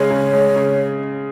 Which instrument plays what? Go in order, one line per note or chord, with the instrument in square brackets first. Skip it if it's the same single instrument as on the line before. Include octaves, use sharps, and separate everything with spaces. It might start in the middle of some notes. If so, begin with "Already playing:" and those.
Already playing: [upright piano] C#3 G#3 [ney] C#5
[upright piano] C#3
G#3
C#3